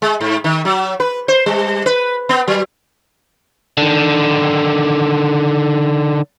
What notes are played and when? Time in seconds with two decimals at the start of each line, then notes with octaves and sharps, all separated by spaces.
0.02 G#3
0.21 G#2
0.44 D#3
0.65 F#3
1.00 B4
1.28 C5
1.46 G3
1.86 B4
2.29 B3
2.48 F#3
3.77 D3 D#3